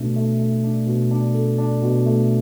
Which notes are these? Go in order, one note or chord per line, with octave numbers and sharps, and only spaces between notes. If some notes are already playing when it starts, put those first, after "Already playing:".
Already playing: B2 A3 D4
A3
A3
D4
B2
D4
A4
D4
B2
A3